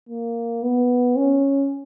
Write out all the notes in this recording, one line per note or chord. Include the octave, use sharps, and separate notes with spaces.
A#3
B3
C#4